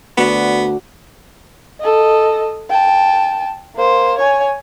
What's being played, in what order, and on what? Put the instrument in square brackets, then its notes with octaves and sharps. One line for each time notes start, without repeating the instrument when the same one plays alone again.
[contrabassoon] D2 [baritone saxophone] B3 [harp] F#4 D5
[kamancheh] A4 D#5
G5 A5
A#3 C5
C#5 G#5